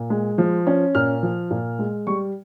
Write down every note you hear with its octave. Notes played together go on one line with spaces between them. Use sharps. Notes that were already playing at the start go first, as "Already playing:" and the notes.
Already playing: A#2
G#3
F3
C#4
A#2 F6
F3
A#2
G#3
G3 C#6